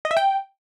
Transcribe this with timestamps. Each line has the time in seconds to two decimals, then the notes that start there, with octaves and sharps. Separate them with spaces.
0.05 D#5
0.11 E5
0.17 G5